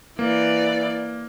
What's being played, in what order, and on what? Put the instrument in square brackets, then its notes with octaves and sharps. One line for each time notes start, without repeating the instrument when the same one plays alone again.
[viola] E3 D5 [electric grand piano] A#3